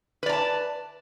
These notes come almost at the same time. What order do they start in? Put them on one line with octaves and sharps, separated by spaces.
B4 D5 A#5 A5